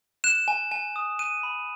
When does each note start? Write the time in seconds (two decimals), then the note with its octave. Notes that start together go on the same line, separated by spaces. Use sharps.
0.24 F#6 E7
0.48 G#5
0.72 G#5
0.96 D#6
1.19 F#6 D#7
1.43 B5